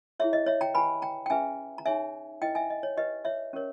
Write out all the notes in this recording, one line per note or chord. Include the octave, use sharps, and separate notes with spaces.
E4 G#4 C#5 E5
D#5
C#5 E5
G5 A#5
G4 B4 G#5 B5
G5 A#5
G5
C#4 G#4 B4 E5 G#5
A#5
D#4 G#4 C#5 E5 G#5
E4 G4 B4 D#5 G5
E5 G#5
D#5
C#5
G4 B4 D#5
C#5 E5
C#4 G4 A#4 C#5